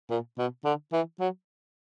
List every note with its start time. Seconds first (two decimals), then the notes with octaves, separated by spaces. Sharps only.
0.10 A#2
0.38 B2
0.65 D3
0.93 E3
1.20 F#3